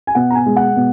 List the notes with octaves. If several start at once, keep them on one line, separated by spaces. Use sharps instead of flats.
G#5
B2 F#5
A#5
G#5
G#3
F#5
B2